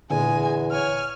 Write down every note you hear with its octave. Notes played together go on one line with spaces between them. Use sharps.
E2 A#2 D3 G#3 G#5
C#5 G#5 F6